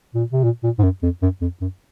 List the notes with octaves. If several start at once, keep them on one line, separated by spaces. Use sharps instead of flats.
A#2
C3
A#2
A#2
G#2
F#2
F2
F#2
F2
F#2